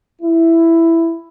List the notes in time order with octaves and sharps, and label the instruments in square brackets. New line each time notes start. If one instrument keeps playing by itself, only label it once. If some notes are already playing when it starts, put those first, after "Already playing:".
[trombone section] E4